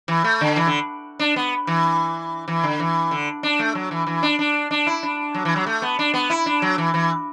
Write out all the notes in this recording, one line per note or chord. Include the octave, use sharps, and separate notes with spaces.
E3
A3
D3
E3
D3
D4
B3
E3
E3
D3
E3
D3
D4
A3
F#3
E3
E3
D4
D4
D4
E4
D4
F#3
E3
F#3
A3
B3
D4
B3
E4
D4
F#3
E3
E3